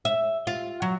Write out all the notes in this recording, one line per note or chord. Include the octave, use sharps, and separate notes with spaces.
E5
F4
F#3